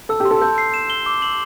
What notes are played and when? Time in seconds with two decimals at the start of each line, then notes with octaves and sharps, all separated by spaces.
0.09 A4 E6
0.20 G4
0.25 C6
0.31 A4
0.42 A4 G6
0.58 C7
0.74 E7
0.90 G7
1.06 D6
1.22 F#7